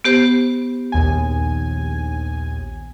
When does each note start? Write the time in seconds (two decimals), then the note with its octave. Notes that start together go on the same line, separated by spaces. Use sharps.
0.04 B3 G4 C5
0.92 A#1 D#2 G#5